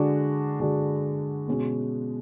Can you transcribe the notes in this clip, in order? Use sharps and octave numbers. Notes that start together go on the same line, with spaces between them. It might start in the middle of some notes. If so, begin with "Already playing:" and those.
Already playing: D3 G#3 D4 F#4
D3 G#3 D4 F#4
B2 G#3 C#4 F#4